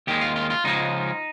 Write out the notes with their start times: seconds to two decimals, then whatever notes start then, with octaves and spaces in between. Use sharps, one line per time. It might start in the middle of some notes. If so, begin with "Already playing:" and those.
0.07 D#2 D#3 G#3 G4
0.21 F4
0.36 F4
0.50 F4
0.64 C#2 C#3 F3 G#3 D#4